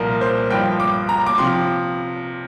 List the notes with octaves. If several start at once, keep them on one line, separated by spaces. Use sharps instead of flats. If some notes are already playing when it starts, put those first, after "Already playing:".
Already playing: C2 A#2 F3 A#4
C5
G1 G2 F3 G5
D6
A#5
D6
C3 F3 C6